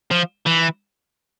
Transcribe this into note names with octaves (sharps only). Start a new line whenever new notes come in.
F3
E3